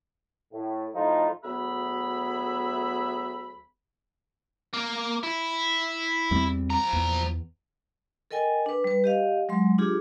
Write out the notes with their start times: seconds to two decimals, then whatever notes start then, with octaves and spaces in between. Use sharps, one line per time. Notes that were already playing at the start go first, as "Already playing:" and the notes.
0.53 A2
0.95 A2 F3 D#4 F4
1.43 D2 F#3 B3 G#4 E5 B5
4.73 A#3
5.23 E4
6.31 E2 G3 C4
6.70 F3 A#5
6.93 E2
8.31 A4 A#4 D#5 G5 G#5
8.66 D4 B4
8.84 G3 B4
9.04 G4 D#5 F5
9.49 F#3 G#3 C6
9.78 D4 F4 G4 G#4